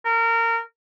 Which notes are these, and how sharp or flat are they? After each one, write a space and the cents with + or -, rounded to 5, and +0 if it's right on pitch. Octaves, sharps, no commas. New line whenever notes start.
A#4 -25